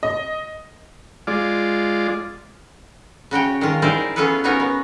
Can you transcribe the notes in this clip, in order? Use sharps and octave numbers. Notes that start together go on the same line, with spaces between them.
D#5
G#3 F4 D5
C#3 F#4 C#5 G5
D#3 G#3 F4
D#4 E4 G#4 A#4 C5 D5
B3 C#4 F4 G#4 A4 B4
B3 C#4 D#4 F#4 A#4 C#5
B3